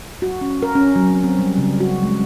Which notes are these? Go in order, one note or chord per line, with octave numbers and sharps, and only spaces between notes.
F#4
C#4
A#4
C#4
F#3
C4
C4
G3
C#3
F#4
G#3